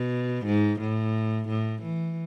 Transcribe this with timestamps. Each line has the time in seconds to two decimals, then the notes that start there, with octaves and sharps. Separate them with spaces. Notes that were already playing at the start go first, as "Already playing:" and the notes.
Already playing: B2
0.46 G#2
0.80 A2
1.49 A2
1.83 E3